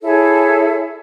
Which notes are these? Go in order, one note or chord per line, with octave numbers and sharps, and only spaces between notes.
E4 G#4 A4 C#5